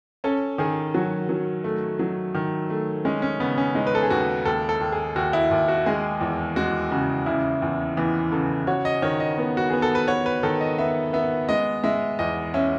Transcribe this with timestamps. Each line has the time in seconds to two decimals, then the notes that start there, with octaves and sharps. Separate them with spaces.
0.24 C#4 A4
0.58 D#3 G#4
0.94 F#3 F#4
1.29 F#3
1.64 A3
1.99 F#3
2.35 D#3
2.70 A3
3.05 G#3 C#4
3.22 C#4
3.40 C#3 B3
3.58 C#4
3.75 G#3 D#4
3.87 B4
3.95 A4
4.03 G#4
4.10 D#2 F#4
4.45 D#2 A4
4.69 A4
4.81 D#2
4.92 G#4
5.16 D#2 F#4
5.33 E4
5.51 D#2
5.68 F#4
5.86 G#3 G#4
6.21 E2
6.56 G#3 F#4
6.91 C#3 F#4
7.26 C#3 E4
7.62 E2
7.97 E3 B3
8.32 C#3 A4
8.67 F#4 C#5
8.85 D#5
9.02 D#3 C#5
9.20 D#5
9.38 B3
9.57 F#4
9.70 B3 G#4
9.82 A4
9.95 B4
10.08 F#4 C#5
10.26 B4
10.43 D#3 A4
10.61 D#5
10.78 B3 E5
11.13 B3 E5
11.49 G#3 D#5
11.84 G#3 E5
12.19 E2 D#5
12.54 C#4 E5